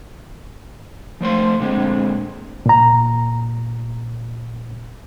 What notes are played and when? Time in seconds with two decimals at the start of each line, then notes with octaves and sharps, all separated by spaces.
1.21 F3 A3 C5 C6
1.59 A#2 D3 G#3 C4
2.66 A#2 A#5